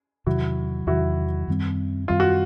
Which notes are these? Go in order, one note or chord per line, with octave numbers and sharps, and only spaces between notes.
E2 C3 D#3 F#3 E4 F#4
E2 C3 D#3 F#3 E4 F#4
F#2 D#3 G3 C4
F#2 D#3 G3 C4 F4
F#4